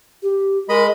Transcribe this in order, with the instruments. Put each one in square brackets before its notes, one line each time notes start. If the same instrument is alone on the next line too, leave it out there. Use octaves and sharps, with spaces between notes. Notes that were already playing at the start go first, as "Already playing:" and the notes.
[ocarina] G4
[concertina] G#3 D#5 B5 [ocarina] A#4